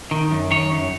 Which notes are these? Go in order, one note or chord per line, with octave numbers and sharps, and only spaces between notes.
D#3
F#2
D#3 C#5
F#2